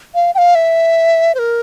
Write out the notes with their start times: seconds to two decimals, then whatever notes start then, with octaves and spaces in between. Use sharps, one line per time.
0.15 F5
0.35 G5
0.38 F5
0.55 E5
1.35 C5
1.39 A#4